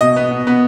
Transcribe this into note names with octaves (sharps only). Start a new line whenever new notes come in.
B2 D#5
B3
B2
B3